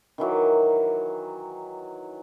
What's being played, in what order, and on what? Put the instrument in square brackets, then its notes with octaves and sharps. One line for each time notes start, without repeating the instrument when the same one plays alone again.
[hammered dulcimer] D#3 E3 F#3 D6